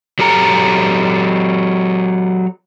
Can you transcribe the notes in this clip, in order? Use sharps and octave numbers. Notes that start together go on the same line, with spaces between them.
F#3 G4 A4 A#5